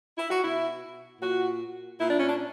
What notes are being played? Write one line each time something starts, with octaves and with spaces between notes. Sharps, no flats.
E4
F#4
B2 E4
A#2 F#4
A#2 E4
D4
C#4
D4